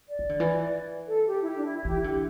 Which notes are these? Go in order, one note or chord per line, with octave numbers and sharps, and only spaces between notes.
D5
E3
D3
E3
A4
G4
E4
G4
D4
E4
E4
E3 G4
E4
D3 G4